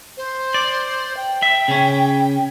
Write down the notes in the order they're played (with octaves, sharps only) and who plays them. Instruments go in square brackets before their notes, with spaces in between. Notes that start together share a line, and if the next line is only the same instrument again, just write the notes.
[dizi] C5
[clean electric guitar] D5
[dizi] G5
[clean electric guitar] E5
C#3 C#4